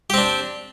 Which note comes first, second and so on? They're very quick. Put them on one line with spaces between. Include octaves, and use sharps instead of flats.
G4 C4 D4